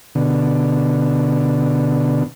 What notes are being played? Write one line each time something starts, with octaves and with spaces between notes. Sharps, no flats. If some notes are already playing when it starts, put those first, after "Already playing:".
B2 D3